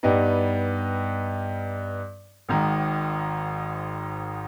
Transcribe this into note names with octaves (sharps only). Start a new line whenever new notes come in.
G2 G3 B3 D#4
G#1 G#2 D#3